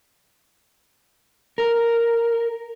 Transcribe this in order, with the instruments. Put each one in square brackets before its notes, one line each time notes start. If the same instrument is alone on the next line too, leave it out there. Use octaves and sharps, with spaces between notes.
[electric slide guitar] A#4